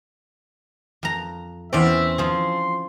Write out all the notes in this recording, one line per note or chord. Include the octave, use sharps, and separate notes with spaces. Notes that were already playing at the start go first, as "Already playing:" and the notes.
F2 A#5
E2 C4 C#4 D5 E5
F3 G#4 C6